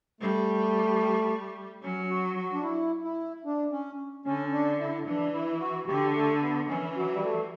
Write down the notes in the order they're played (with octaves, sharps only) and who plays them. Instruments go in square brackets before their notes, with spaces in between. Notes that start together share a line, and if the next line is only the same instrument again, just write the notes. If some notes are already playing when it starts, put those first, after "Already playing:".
[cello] G3 [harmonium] A3
[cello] F#3 [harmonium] C#4
[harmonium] F#4
F#4
D4
E4
E4
D4
C#4
[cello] D3 [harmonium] C#4
[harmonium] D4
E4
[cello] E3 [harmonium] D4
[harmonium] E4
F#4
[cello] D3 [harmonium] G4
[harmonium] A3
B3
[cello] E3 [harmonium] C#4
[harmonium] F#3
G3
A3